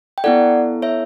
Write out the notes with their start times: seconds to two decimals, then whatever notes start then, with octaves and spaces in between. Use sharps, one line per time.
0.18 G5
0.24 B3 E4 A4 D5 F#5
0.82 C#5 E5